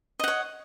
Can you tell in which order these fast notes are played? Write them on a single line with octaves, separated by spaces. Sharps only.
D#5 F#5 C#5